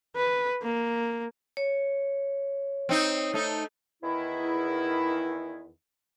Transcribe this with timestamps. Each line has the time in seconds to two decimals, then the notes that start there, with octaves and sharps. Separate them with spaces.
0.16 B4
0.62 A#3
1.57 C#5
2.89 C4 D#4
3.34 A3 D#4
4.03 E2 D#3 E4